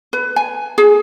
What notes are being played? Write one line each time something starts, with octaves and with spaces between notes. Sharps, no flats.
B4
G#5
G#4